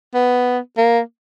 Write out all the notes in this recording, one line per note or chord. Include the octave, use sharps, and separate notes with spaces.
B3
A#3